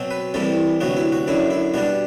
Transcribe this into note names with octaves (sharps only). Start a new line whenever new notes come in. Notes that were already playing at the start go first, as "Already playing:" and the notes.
Already playing: B2 F#3 C4
B4
C2 C3 E3 G3 A4
D2 C3 F#3 B3 F#4
E4
F#4
F#2 D3 F#3 E4
E4
B2 G3 D4 F#4